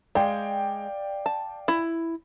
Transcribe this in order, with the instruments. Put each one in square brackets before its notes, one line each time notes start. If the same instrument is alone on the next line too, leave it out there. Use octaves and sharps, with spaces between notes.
[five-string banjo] G#3 [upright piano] D5 F5 G5
[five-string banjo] A5
E4